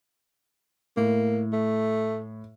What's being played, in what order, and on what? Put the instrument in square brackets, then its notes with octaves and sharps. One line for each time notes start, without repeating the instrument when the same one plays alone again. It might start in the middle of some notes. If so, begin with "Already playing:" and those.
[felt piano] A2 [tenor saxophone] A#3
[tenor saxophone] A3